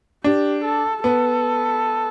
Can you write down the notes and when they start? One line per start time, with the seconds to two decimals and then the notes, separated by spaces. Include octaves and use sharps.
0.24 D4 G4
0.64 A4
1.04 B3 A4